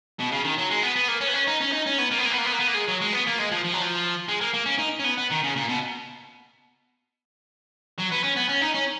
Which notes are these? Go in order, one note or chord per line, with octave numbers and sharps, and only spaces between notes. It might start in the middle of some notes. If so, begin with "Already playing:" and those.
B2
C#3
D#3
F#3
G#3
B3
B3
A#3
C#4
B3
C#4
D#4
C#4
D#4
C#4
B3
A#3
B3
A#3
B3
A#3
B3
A#3
B3
A#3
G#3
F#3
G#3
B3
A#3
G#3
F3
F3
F#3
F3
G#3
A#3
A#3
C#4
D#4
C#4
B3
B3
D#3
C#3
A#2
B2
F#3
B3
C#4
B3
C#4
D#4
C#4